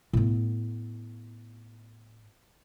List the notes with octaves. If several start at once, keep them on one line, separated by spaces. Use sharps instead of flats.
A2 B3